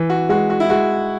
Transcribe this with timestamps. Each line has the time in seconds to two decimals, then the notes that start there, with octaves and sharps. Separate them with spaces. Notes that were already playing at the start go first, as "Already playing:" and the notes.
Already playing: E3
0.10 F#4
0.29 G#3 F#4
0.50 F#4
0.60 E4
0.69 G#3 F#4